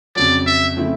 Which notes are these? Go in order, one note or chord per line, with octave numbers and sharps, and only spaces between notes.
F2 C#3 F#3 D5
E5
C#3 F3 A3 C4 E4